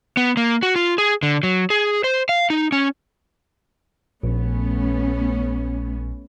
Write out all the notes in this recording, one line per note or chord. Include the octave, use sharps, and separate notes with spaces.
B3
A#3
F#4
F4
G#4
D3
F#3
G#4
C5
F5
D#4
C#4
A#1 A3 B3 C#4